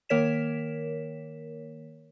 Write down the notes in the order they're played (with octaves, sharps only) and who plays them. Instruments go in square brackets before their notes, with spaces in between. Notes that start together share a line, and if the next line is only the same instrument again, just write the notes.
[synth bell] D#3 A#3 A#4 C#5 B6 E7